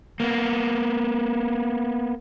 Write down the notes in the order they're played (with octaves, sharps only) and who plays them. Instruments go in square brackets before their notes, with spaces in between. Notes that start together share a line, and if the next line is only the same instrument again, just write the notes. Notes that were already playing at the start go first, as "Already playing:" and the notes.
[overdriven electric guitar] A#3 B3